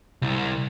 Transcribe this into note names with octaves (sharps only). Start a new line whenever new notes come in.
C2